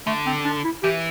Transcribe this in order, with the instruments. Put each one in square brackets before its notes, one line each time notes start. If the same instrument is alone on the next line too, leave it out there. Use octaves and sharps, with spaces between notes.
[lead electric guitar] D3 [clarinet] A3
[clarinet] C4
D4
E4
[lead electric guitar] E3 [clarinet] G4